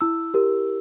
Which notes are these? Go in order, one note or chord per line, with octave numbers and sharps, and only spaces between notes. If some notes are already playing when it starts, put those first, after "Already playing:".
E4 E6
G4 A#4